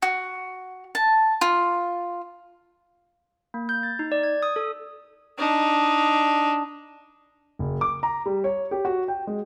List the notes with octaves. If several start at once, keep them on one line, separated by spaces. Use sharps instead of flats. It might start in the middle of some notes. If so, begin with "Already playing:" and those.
F#4
A5
F4
A#3
G6
A6
D#4
D5
G#6
D#6
A4
D4 D#4
F#1
D6
A#5
G3
C#5
G4
F#4
G5
G#3